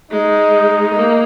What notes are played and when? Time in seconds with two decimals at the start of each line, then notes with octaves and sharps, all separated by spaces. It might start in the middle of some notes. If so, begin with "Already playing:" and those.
0.11 G#3 D#4
0.95 A#3